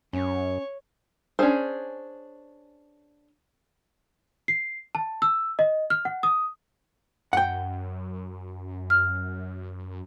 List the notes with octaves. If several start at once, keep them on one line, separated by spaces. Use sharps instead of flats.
F#2 C#4 C#5
C#4 D4 E4 G#4 C5
C7
A5
E6
D#5
F6
F#5
D#6
F#2 F#5 G5
F6